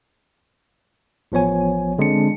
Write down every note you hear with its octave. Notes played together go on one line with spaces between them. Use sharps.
A1 F3 B3 C#5 G#5
D3 G#3 C4 D4 A5 C#7